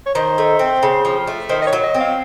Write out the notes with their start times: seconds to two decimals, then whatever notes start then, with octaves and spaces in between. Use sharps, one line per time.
0.06 C#5
0.15 D#3 C5
0.38 A3
0.59 C4
0.83 C#3
1.05 F3
1.27 A3
1.49 D#3 C5
1.62 D#5
1.67 C#5
1.73 F#3
1.83 D#5
1.94 C4
2.00 F5